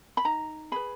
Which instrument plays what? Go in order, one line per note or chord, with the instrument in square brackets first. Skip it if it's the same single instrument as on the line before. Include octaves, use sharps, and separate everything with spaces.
[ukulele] B5
D#4 A#5
G#4 B4 B5